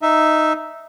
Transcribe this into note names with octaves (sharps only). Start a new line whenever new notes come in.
D#4 E5